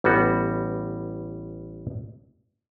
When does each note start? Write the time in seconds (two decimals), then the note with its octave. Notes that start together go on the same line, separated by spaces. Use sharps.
0.04 A1 G3 B3 F#4